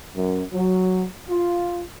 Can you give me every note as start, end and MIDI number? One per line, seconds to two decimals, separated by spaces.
0.16 0.43 42
0.53 1.05 54
1.29 1.80 65